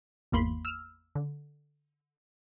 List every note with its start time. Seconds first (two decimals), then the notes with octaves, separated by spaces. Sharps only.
0.32 G#1 E2 A#3 B5 C6
0.65 E6 F6
1.15 D3